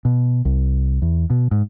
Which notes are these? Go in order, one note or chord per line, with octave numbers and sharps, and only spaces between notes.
B2
C2
E2
B2
G#2